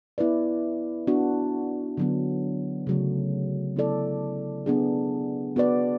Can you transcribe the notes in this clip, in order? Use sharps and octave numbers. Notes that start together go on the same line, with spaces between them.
B3 E4 B4 D5
B3 D4 F#4
D3 F#3 B3
C#3 F#3 A3
B3 E4 A4 D5
B3 D4 G#4
B3 F#4 B4 D5